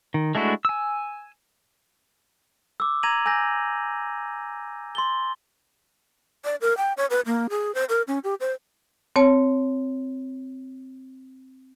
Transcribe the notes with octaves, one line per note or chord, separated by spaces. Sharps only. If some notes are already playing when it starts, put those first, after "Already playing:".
D#3
G#3 A3 D4 E4 F#4
G#5 E6
D6 E6
A#5 G#6 A#6 D#7 F7 F#7
G#5 E6 G6 A#6
C6 A6 G7
D5
A#4
G5
C#5
B4
A#3
G#4
C5
A#4
C#4
G4
C5
C4 C#5 A5